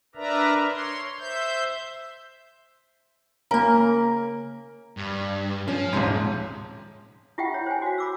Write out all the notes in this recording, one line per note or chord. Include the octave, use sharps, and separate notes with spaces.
D4 A#4 B4 D5 E5 A#5
C#5 C6
C5 E5 G6
C#3 A#3 A#4
G2
F3 C#4
D#1 G#2 C3
E4 F4 G4 E5 F#5 G5
C#5
C5 G#5
F#4 F5
B5 D6 E6